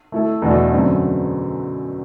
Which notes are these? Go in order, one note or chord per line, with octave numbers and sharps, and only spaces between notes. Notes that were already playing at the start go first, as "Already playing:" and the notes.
A3 E4 A4
E2 B2 A3 D4 F#4
F#2 D3 F#3 A3 C4